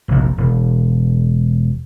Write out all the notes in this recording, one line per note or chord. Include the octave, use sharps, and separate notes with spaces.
F1 A#1
E1